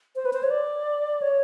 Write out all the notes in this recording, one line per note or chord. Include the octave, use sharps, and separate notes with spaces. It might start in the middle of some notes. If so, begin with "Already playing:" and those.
C5
B4
C5
C#5
D5
C#5